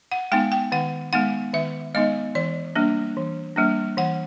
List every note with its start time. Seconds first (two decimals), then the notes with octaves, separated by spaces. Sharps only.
0.12 F#5
0.32 G#3 B3 D#4 G5
0.52 G5
0.72 D#3 F#5
1.13 G#3 B3 D#4 F#5
1.54 D#3 E5
1.94 G#3 B3 D#4 D#5
2.35 E3 D5
2.76 G3 A#3 D4
3.16 E3
3.56 G3 A#3 D4
3.97 E3 F#5